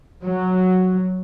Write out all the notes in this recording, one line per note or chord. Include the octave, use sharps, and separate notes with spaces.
F#3